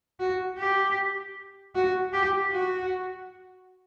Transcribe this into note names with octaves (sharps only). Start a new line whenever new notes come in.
F#4
G4
F#4
G4
F#4